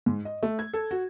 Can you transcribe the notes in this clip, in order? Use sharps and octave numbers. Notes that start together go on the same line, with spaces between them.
G#2
D#5
A3
G#6
A4
F#4